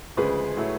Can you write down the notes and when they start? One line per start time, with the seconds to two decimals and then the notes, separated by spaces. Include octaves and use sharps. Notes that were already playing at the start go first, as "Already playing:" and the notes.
0.17 D2 C#3 F3 G#3 G#4 B4
0.57 A2 F#3 A3